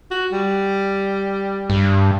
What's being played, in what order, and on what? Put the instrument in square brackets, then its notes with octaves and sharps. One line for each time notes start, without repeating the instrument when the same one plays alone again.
[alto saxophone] F#4
G3
[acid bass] G2